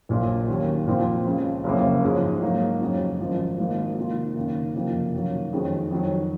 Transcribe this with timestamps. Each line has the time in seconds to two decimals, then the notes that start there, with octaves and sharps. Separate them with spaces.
0.09 A#1 A#2 F#3
0.48 D#2 D#3 F#3 C#4
0.87 A#2 F3 C4
1.26 C#2 C#3 F3
1.64 F#1 F2 C#3 F#3 A#3
2.03 G#2 F3 G#3 C#4
2.42 G#2 F#3 A#3 D#4
2.81 F2 C#3 F#3
3.20 G#1 F#2 F3
3.58 G#1 G#2 F3 A#3
3.97 C3 D#3 A#3 F4
4.36 F#1 F#2 D#3 A#3
4.75 F#1 F2 C3 F3 A#3
5.13 F#2 D#3 F#3 A#3
5.53 F2 D#3 G#3 C#4 F#4
5.91 F2 D#3 F#3